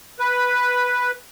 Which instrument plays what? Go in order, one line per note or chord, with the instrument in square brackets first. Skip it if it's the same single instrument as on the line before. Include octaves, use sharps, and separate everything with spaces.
[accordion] B4